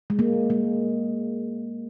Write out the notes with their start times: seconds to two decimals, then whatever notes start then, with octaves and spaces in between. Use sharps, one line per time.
0.10 G#3
0.19 A#3
0.50 G#3